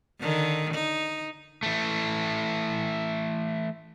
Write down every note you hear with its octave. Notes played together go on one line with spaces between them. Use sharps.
D3 D#3
D#4
E3 A3